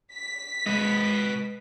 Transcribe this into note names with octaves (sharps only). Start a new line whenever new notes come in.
B6
G#3 B4 D#5